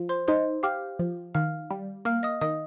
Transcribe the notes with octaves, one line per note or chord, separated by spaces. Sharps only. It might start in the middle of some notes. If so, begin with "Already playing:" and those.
Already playing: F3
C5 C6
D#4 C5 C6
G4 F5 F6
F3
D#3 F5 F6
G3
A#3 F5 F6
D#5 D#6
D#3 D#5 D#6